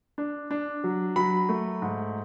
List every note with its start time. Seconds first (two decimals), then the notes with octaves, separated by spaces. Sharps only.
0.18 D4
0.51 D4
0.84 F#3
1.16 F#3 B5
1.49 A3
1.82 G#2